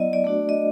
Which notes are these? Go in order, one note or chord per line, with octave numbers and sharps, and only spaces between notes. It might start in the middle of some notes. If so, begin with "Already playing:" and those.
Already playing: F#3 B3 E4 D5 D#5
D5
A3 D4 F#4
D#5